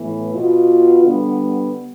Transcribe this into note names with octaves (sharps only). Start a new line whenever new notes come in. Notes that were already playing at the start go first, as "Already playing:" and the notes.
Already playing: A2 E3 B3
B2 B3 F4
D3 G3 B3